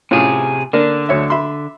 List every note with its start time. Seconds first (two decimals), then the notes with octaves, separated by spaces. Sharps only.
0.11 A2 C3 C#4 F4 G#4
0.73 D3 A#3 D4 A#4
1.09 D2 C#5 E5
1.30 E5 B5 C6